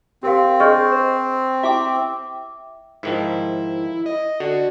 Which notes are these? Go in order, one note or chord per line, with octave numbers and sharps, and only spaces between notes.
C4 G4 A#4 F5
D4 G#4 D#5 C#6 F6 G6
C5
E4 G4 E5 G5 D6
G#2 D#3 F3 E4
D#5
D3 F#4